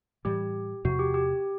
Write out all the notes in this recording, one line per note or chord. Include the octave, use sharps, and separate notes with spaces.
A2 E3 G3 G4
E2 C3 F3 F#4
G4
G4